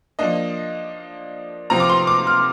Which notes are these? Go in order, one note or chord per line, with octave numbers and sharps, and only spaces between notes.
F3 A#3 D4 D#5
C3 F3 C4 F4 A#5
D6
C6
D6
F6